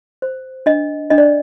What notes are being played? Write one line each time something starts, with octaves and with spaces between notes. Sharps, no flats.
C5
D4 D#5
D4 D#5
D5